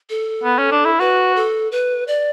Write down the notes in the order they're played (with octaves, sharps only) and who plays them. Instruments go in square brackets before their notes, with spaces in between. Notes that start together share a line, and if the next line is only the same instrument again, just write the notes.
[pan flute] A4
[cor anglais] B3
C#4
D4
E4
[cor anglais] F#4 [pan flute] B4
[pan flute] A4
B4
D5